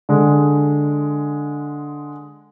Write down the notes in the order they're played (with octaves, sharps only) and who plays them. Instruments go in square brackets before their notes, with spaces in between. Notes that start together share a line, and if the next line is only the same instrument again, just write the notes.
[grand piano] D3 G#3